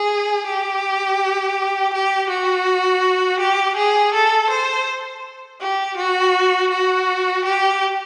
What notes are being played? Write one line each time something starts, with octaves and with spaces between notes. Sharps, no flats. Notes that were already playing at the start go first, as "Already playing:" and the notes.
Already playing: G#4
G4
G4
F#4
G4
G#4
A4
C5
G4
F#4
F#4
G4